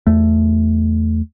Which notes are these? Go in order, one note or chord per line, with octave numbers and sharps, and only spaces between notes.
E2 A3